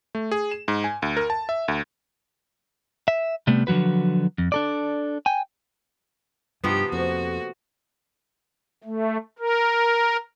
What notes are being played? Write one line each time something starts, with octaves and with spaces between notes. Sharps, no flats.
A3
G#4
E7
G#2
G#5
D2
A#4
A5
E5
D2
E5
C3 G3 A3 B3
D3 F3 F#3 F#4 B4
F2
D4 A4 D5
G5 G#5
G2 C3 F3 B3 D#4 G4
F2 A3 A#3 F#4 C5
A3
A#4